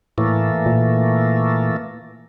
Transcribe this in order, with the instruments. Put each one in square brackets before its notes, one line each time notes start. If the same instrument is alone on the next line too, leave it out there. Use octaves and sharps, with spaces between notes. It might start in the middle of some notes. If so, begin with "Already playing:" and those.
[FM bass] A2 [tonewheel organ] E3 A3 A#3
[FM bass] A#2